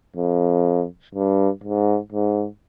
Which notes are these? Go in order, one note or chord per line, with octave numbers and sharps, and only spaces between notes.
F2
G2
G#2
G#2